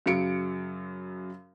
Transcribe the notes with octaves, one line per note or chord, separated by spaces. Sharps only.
F#2 C#3 F#3 C#7 D7